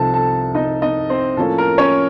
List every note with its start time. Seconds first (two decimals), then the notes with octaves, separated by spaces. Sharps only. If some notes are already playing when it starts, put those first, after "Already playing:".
Already playing: C2 C3 F3 C4 D#4 A4 A5
0.14 A4 A5
0.55 D#4 D#5
0.82 D#4 D#5
1.10 C4 C5
1.37 A2 F3 A#3 C#4 A4
1.58 A#4
1.78 C#4 C#5